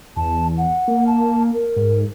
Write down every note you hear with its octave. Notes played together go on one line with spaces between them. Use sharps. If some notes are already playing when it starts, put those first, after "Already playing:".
E2 A5
F#5
A#3
A5
A#4
G#2